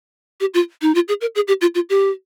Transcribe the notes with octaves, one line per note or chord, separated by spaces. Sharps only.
G4
F4
D#4
F4
G#4
A#4
G#4
G4
F4
F4
G4